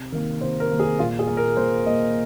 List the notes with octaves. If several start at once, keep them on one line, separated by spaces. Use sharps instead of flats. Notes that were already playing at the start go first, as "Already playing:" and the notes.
Already playing: C3
D#3 A#3 A#4
C3 C5
A#4
D#3 A#3
G#4
A#2 F4
G#4
A#3
A#4
A#2 C5
A#3 D#5